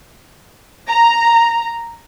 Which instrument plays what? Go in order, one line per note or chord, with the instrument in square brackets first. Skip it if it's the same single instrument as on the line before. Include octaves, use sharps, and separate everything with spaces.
[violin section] A#5